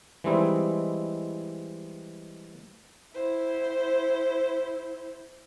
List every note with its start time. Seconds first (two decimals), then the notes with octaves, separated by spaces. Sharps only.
0.24 E3 G3 G#3 C4 D#4 E4
3.14 E4 C5